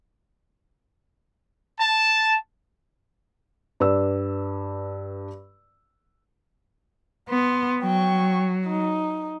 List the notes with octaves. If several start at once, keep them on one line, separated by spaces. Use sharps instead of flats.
A5
G2 B4 D5 E6
B3 C6
F#3 G5 C#6
D#4